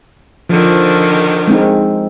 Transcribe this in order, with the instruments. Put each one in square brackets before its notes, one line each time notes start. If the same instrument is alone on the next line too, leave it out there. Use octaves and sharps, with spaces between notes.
[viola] D3 D#3 [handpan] F3
[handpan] G#3 C4 D#4